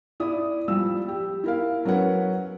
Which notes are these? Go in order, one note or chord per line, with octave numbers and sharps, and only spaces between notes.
E4 D5 D#6
F3 G3 E6
G4
E4 A#4 F5
F#3 C#4 A#4 B4 F#5